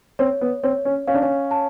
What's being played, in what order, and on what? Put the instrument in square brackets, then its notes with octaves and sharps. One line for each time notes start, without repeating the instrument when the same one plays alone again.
[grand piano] C4 [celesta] C#5
[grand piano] B3
[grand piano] C4 [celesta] C#5
[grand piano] C#4
[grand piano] C#4 [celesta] F5
[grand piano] D4
C#4
[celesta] A5